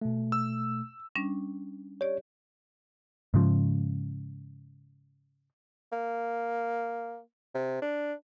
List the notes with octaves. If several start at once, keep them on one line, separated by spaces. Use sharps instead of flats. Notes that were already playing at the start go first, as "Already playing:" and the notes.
B2 A3
E6
G3 C#4 D4
G4 C#5 D5
G#2 C#3 F3
A#3
C3
D4